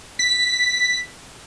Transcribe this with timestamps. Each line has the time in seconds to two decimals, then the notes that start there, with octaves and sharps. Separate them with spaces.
0.19 B6